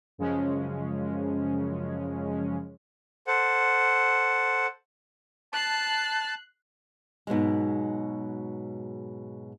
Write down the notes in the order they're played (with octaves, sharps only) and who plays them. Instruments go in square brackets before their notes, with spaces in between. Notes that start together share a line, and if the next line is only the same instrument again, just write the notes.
[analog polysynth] F#2 C#3 F3 G#3 C#4
[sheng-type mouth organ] A4 C5 F#5
[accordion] A5 [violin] F#6 C7
[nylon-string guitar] G#2 B2 F#3 G#3